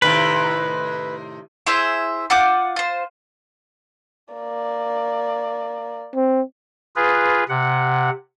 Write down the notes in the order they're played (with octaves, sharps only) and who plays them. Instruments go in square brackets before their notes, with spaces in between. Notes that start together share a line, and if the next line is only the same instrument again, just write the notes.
[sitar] A2 C3 D#3 [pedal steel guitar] B4
[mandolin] E4 G#4 C5 E5
F4 F#5 D6 G6
F4 C5
[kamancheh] A#3 D5
[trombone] C4
[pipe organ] F4 G#4 B4
C3 F#5